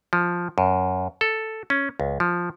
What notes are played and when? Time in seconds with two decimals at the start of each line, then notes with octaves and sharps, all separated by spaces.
0.13 F3
0.58 F#2
1.21 A4
1.70 C#4
2.00 C#2
2.20 F3